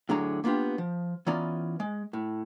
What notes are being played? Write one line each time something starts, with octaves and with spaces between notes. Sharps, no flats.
A2 D3 F#3 G#4 A#5
A#3 B3 D4 F4 G4
F3
E3 B3 C#4 F4 D5 A#5
G#3
A2